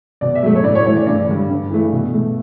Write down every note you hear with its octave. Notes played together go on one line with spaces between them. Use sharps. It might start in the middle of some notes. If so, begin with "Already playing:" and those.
B2 D5
E5
F#3 A3
C#5
A2 D5
C#5
E3 A3 C#5
D5
G2 D5
D3 G3
G2
E3 A3
B2
A3